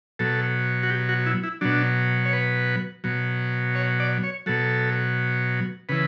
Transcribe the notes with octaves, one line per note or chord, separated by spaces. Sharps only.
B2 F#3 A4
F#4
G4
F#4
E4
E4
B2 F#3 D4
C#5
B4
B2 F#3
C#5
D5
C#5
B2 F#3 A4
C#3 E3 B4